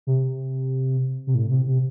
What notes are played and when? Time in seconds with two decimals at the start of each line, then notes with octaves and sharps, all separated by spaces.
0.07 C3
1.27 C3
1.35 A2
1.51 C3
1.67 C3